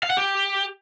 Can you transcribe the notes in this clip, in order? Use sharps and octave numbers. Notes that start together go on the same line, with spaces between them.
F5
F#5
G4